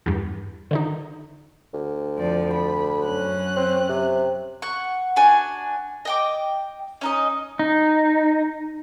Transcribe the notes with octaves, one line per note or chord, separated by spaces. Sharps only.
E2 G2
D3 D#3 D#4
D2
F2 F3 D5
B5
F#2 C#4 F#6
C4
C3
F#5 C#6
D4 F#4 G#5
D#5 G5 D6
C#4 D#4 D#5
D#4